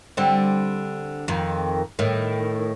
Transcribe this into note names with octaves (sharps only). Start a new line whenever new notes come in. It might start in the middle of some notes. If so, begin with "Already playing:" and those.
D3 G3 C4
F2 D#3
A2 D#3